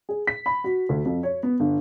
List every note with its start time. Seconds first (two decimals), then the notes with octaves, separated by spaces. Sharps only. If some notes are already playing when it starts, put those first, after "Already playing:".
0.09 G#4
0.27 B6
0.46 B5
0.64 F#4
0.89 D2
1.05 F2
1.23 C#5
1.43 B3
1.60 G1